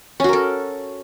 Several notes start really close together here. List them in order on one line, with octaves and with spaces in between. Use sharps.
C#4 F#4 A#4 A4